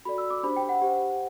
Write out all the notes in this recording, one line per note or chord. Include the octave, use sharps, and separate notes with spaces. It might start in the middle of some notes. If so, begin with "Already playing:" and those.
F#4 A4 D5 B5
E6
D6
D4 G4 C5 B5
G5
F#5
G4 C5